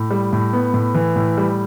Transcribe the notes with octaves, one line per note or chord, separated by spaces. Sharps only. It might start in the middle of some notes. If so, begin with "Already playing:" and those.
Already playing: A2
G3
A2
B3
A2
E3
A2
G3